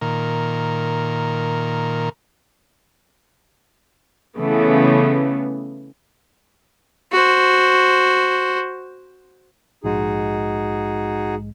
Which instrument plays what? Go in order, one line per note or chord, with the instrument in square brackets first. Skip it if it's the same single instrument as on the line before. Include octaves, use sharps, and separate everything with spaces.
[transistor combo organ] A#2 D#3 A#4
[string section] C#3 E3 A3 B3
[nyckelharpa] F#4 C5
[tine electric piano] A#1 G#2 G#3 [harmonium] D#4 F#4 G#4